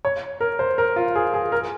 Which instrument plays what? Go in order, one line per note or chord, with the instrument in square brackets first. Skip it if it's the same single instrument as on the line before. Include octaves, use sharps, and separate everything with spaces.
[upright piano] C#5
A#4
C5
A#4
F4
G#4
G#4
A#4